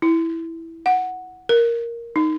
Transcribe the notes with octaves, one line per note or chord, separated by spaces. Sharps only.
E4
F#5
A#4
D#4